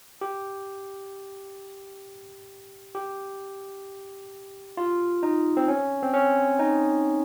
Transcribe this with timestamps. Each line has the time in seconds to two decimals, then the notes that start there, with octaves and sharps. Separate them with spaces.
0.21 G4
2.95 G4
4.77 F4
5.23 D#4
5.57 C4
5.68 C#4
6.03 C4
6.14 C#4
6.59 D#4